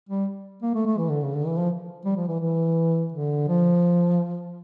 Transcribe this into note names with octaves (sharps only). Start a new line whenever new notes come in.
G3
A#3
A3
A3
E3
D3
C#3
D3
E3
F3
G3
F3
E3
E3
D3
F3